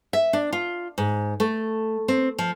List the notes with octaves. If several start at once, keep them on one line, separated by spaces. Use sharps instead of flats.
E5
D4
F4
G#2
A3
C4
F3